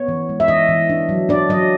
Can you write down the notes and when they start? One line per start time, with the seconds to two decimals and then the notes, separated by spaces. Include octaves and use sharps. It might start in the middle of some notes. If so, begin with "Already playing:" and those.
Already playing: B3 C#5
0.08 E3
0.29 G#3
0.40 E5
0.48 E3 D#5
0.69 E3
0.89 D4
1.09 F#3
1.29 D4 D5
1.49 F#3 D#5